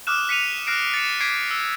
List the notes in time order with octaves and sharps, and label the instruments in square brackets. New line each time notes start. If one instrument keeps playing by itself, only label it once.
[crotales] D6 D#6 F6 F#6 E7
B6 C#7 D#7 F7
F6 F#6 A#6 C7 D7
A6 C#7 E7
D6 G#6 B6 C7 D7 D#7
E6